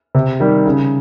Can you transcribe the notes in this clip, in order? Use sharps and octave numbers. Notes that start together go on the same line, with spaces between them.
C3
D#3 G3
C#3